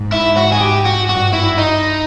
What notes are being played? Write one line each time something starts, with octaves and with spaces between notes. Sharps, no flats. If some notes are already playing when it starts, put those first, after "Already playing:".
Already playing: G#2
E4
F#4
G#4
G4
F#4
G2 F#4
E4
D#4